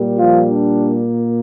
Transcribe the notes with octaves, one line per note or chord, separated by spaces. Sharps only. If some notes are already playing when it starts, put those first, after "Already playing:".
Already playing: A#2 G3 A#3
F3 F4
D4